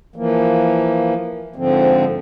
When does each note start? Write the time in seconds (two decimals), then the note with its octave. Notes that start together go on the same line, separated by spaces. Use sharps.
0.16 E3 F3 A#3
1.56 G#2 D3 F3 C4